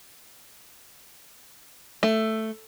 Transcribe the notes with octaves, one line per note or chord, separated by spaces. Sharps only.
A3